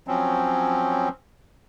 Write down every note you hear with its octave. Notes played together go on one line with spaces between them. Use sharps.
F3 F#3 C4 C#4